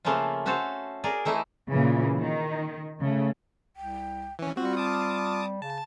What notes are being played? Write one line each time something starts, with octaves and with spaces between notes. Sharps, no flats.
C#3 F3 A3 A#3 C#4 F4
C#4 F#4 A4 C5 F5
G#4 A#4 D5
E3 A3 D#4 E4
A#2 C#3 E3
D#3
C#3 A3
C2 G5
E3 C#4
G3 C4 F4 F#4
A5 D6 D#6
C#3 A5